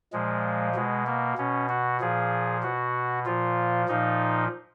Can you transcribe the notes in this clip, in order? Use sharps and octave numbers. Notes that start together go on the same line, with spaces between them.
A#2 F3 G#3
B2 G#3
A#3
B2 C#4
F#4
A#2 F3 G#4
B2 F#4
A#2 F3 F4
A#2 F3 D#4